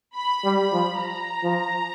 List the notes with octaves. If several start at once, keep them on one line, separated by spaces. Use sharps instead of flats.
B5
G3
B5
F3
A#5
F3